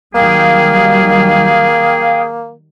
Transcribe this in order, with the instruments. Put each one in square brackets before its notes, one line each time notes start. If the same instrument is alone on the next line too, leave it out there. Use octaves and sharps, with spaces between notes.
[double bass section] D#3 F#3 G3 [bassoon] A#3 [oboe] G#4 [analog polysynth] F5 G5 D#6